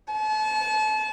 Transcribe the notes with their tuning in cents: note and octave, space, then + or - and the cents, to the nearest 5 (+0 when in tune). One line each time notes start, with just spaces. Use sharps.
A5 -35